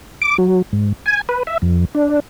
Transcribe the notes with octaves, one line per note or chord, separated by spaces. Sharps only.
D6
F#3
G#2
G#5
B4
E5
F2
D4